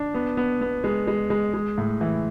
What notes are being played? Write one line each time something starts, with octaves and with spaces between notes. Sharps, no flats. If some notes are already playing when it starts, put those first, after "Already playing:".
Already playing: D4
B3
B3
B3
G#3
G#3
G#3
G#3
A2
E3